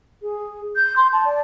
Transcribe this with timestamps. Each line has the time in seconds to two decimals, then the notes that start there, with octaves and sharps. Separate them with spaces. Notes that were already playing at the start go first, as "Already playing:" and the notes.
0.22 G#4
0.76 G6
0.96 C6
1.13 A5
1.25 D5